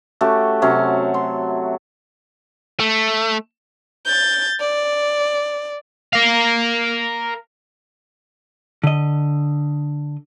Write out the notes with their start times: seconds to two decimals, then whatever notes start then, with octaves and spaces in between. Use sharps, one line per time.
0.21 A3 C#4 F#4 G4
0.62 C3 F#3 C#4 F#4
1.14 C6
2.80 A3
4.06 G6 A6
4.60 D5
6.13 A#4 F5
8.83 D3 D#5